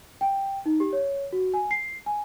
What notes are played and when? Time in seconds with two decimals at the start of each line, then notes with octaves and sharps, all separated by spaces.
0.21 G5
0.66 D#4
0.80 G4
0.93 C#5
1.33 F#4
1.54 G#5
1.71 C7
2.06 G#5